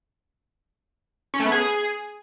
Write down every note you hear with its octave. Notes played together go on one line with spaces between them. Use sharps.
C#4
A3
B3
G#4